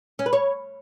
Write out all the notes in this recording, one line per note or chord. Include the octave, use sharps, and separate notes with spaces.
C#4
B4
C#5